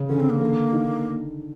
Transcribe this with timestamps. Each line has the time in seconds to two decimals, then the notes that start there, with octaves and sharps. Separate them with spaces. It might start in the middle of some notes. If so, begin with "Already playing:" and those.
Already playing: C#3
0.09 D3 C#4
0.20 C4
0.30 A#3
0.40 D3
0.73 D#3